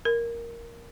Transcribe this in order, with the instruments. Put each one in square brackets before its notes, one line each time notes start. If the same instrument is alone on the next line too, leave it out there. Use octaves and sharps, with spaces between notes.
[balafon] A#4